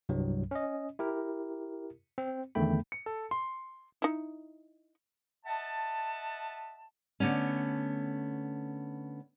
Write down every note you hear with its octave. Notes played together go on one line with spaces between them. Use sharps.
C2 G2 F#3
C#4 D#5
E4 G4 A#4
C4
E2 D3 D#3 A3 G5 B5
C#7
A4
C6
D#4 E4
D#5 E5 F#5 A5
D3 A3 B3 C#4